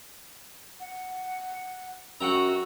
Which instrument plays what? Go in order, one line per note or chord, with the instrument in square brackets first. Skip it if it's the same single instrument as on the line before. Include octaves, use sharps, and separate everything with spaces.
[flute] F#5
[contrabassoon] F#2 [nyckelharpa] F#4 [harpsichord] F#5 G5 A#5 [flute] E6